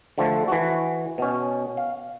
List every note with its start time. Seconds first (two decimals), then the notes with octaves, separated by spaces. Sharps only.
0.18 D3 F3 A3
0.48 E3 F#4
1.18 B2 C#4
1.77 F5